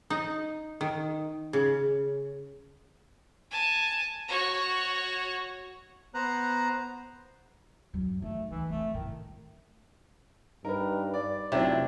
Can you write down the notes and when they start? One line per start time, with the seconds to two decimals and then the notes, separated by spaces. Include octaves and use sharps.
0.10 D#4
0.81 D#3
1.53 C#3
3.51 G#5 A5
4.28 F#4 C#5
6.14 B3 C5 A#5 F#6
7.94 F#2 F#3
8.22 D#3 A3
8.50 D2 E3
8.69 F1 F3 A3
8.94 D2 A2 D#3
10.65 G2 D#4 A#4 B4
11.14 D5
11.52 F1 C3 F#3 D4 E4